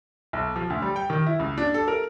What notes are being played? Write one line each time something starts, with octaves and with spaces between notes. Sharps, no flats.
B1
F3
D2
G3
G5
D#3
E4
C#2
D4
A4
A#4